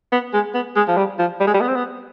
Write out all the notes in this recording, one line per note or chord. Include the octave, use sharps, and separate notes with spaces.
B3
G#3
B3
G#3
F3
G3
F3
G3
G#3
G3
B3
C4
B3